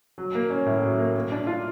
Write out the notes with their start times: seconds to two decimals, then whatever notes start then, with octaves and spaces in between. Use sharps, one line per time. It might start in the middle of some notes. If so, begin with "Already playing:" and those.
0.18 F#3
0.35 A#3
0.50 C#4
0.66 A2
0.84 F#3
0.99 A#3
1.15 A#3
1.32 D4
1.47 F4